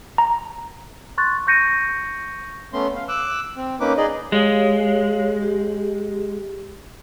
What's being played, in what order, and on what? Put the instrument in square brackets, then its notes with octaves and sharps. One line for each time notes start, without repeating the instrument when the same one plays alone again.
[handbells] A#5
[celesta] C6 C#6 F#6 A6
C#6 G6 A#6 C#7 D#7
[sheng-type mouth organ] A3 B3 C#4 C6
F5
D6 E6 F#6
C4
A#3 C#4 D#4 B4 D6
D#4 G#4 D5 D#5
[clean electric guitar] G#3 [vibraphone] G4 C#5 F5
[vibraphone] G4